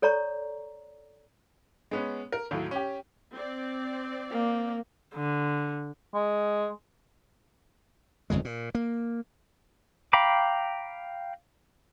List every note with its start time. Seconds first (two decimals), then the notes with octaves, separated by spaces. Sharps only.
0.02 A4 C#5 D5 A#5 C#6
1.91 G#3 B3 C#4
2.32 A#4
2.51 D#2 A2 F#3
2.71 C#4 G4
3.35 C4 D5
4.31 A#3
5.15 D3
6.14 G#3
8.30 G1 F2 C#3 G#3
8.45 A#2
8.75 A#3
10.13 F5 G5 A#5 B5 D6